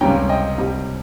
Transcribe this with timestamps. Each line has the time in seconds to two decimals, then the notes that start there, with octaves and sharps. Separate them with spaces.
0.01 C#2 C3 G3 C#4 G5 A#5
0.29 D#5 G5
0.58 C2 C3 G3